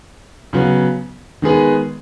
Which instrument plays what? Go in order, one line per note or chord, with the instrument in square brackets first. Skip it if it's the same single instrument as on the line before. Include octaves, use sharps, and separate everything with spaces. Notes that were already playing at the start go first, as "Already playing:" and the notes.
[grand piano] C#3 F#3 B3
D#3 G#3 B3 G#4 B4